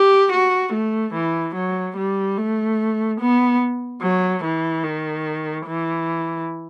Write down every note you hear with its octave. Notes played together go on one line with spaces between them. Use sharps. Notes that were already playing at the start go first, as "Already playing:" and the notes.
Already playing: G4
F#4
A3
E3
F#3
G3
A3
B3
F#3
E3
D#3
E3